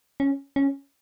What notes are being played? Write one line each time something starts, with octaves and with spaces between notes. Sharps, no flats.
C#4
C#4